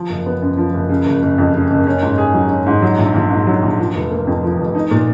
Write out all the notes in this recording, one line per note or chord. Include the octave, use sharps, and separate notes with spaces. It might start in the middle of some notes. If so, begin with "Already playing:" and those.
Already playing: F3
F#1
B3
F#2
F3
F#1
C#3
F#1
F#1
F2
C#3
F#1
C#4
G#2
G#4
F#3
C#4
G#2
F#3
A#1
A#1
G#2
F#3
A#1
F3
F1
A#3
F2
F3
F1
D#4
A#2